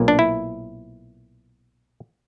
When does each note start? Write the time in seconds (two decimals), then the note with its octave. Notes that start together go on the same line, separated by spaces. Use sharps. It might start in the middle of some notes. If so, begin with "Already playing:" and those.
Already playing: B1 A#2 A#3
0.08 D4
0.19 E4